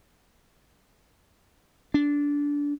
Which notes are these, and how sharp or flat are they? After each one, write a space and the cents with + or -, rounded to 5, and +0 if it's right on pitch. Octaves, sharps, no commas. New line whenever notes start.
D4 -20